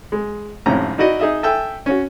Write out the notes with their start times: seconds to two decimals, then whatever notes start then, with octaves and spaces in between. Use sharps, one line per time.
0.12 G#3
0.66 G#1 F2 A2 C3 C#4 A#5
0.98 D#4 E4 F#4 D5 D#5
1.20 D#4 G#4 D#5 E5
1.43 A4 E5 G5 G#5 E6
1.86 C#4 F#4